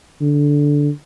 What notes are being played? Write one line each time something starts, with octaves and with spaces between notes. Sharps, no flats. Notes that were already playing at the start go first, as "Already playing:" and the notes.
D3